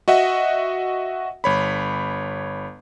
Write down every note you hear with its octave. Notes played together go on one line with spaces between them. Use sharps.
F#4 D#5 E5 F#5
G1 C#5 B5